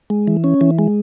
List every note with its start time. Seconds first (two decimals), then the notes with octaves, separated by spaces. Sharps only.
0.10 G#3
0.27 E3
0.44 C#4
0.61 E3
0.79 G#3